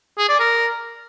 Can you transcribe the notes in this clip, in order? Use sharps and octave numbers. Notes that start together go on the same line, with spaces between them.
G#4
D5
A#4